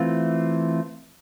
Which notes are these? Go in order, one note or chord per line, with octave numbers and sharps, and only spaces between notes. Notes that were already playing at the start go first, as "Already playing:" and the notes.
Already playing: E3 A3 C4 F4